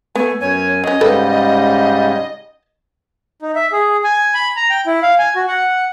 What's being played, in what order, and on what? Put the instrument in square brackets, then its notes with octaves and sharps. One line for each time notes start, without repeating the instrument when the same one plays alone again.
[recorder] A3 [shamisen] B3 [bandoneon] G#5
[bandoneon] F#2 G#5 [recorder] C#5
[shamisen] F#3 C#4 [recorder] D#5
[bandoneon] G#2 C#3 G3 [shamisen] A4 B4
[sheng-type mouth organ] D#4
E5
G#4
G#5
B5
A#5
G5
E4
F5
G#5
F#4
F#5